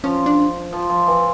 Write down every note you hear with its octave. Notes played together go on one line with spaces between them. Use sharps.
F3 C#4
D4
F3
F3
E3